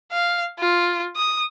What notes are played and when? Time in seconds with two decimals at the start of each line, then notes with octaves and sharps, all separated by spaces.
0.13 F5
0.59 F4
1.16 D#6